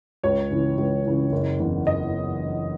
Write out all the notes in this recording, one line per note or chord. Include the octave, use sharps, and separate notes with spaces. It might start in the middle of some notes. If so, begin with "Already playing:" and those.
C#2 C#5
C#3 E3
C#2
C#3 E3
F#1
E2 C#3
D#5